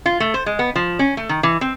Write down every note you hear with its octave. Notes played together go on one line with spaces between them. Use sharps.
F4
A3
C5
G#3
B3
F3
C#4
A3
D#3
E3
C4